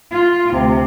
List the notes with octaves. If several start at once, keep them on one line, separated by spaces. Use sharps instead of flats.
F4
D2 C3